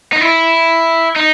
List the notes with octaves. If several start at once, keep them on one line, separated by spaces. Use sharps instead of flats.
D#4
E4
D#4